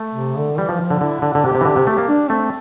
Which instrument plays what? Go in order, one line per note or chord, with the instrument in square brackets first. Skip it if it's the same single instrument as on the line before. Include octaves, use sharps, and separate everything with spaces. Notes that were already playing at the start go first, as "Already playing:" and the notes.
Already playing: [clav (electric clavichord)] A3
[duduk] C3
D3
[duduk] E3 [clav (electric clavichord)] G3
[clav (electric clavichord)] F3
[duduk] F3
[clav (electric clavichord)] D3
[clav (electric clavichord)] D3 [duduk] E4
[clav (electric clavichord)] D3
D3
[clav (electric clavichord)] C3 [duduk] G4
[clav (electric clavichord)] C3
E3
D3
C3
[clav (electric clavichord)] A3 [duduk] G4
[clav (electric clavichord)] A#3
[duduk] D4
[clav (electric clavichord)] A3 [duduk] C4